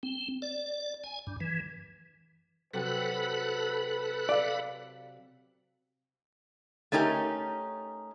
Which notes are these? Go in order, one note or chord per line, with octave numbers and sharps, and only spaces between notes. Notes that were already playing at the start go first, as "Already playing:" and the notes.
C4
D5
G#5
G2
E3
C3 F#3 A4 B4 B5 F#6
D5 F5
A3 C#4 D#4 G4 A#4